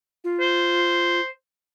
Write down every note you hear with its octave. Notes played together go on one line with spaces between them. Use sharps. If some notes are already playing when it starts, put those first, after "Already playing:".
F4
C5